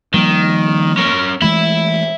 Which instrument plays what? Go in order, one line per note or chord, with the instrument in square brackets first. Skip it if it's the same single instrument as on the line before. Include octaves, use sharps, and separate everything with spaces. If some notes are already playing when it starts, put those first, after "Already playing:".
[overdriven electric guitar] D#3 [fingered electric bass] F3 G3 A#3
[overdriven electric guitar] C#4 A#4
[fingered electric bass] E3 G#3 A3 [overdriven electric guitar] E5 B5